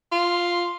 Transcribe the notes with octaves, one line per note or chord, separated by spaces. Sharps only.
F4